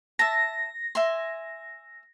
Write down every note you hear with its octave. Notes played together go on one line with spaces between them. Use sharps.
E5 A5 A#6
E5 G#5 C6